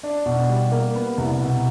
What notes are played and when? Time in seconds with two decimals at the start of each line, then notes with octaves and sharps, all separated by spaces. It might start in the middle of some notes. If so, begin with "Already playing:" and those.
0.03 D4
0.26 B2
0.49 G3
0.72 A#3
0.95 B3
1.18 C2
1.41 B2